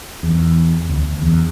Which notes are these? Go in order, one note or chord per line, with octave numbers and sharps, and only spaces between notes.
E2
D2
E2